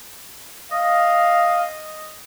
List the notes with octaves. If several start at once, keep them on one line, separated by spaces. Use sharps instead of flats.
D#5 F5